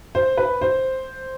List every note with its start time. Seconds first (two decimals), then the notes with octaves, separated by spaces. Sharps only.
0.15 C5
0.37 B4
0.61 C5